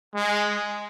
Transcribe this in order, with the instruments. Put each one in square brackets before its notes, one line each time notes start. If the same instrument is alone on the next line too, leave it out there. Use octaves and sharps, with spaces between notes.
[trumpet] G#3